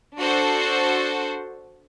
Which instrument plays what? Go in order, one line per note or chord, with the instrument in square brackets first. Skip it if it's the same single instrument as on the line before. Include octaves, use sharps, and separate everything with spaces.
[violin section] D4 F#4 A4 C5